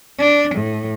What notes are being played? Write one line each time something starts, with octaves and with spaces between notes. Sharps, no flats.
D4
A2